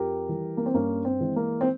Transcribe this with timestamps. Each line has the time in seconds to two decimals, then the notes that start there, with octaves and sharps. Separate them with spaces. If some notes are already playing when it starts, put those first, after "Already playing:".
Already playing: F2 G4 A#4
0.29 E3 G3
0.57 A#3
0.66 C4
0.74 G2 A#3 C#4
1.05 C4
1.21 E3 G#3
1.36 A#3
1.61 C4